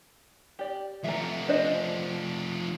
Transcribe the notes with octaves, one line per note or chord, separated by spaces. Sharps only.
G4 D5
F3 A3 E5 A#5
D4 C5 D#5